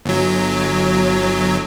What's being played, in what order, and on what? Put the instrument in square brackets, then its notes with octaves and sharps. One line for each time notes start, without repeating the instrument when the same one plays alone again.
[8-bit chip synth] G1 F#3